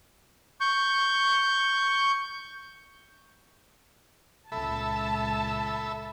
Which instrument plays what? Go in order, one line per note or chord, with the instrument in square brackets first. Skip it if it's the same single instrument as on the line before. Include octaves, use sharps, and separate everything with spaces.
[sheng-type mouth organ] C#6 G6
[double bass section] C#2 A#2 [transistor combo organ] A4 E5 B5 [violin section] A5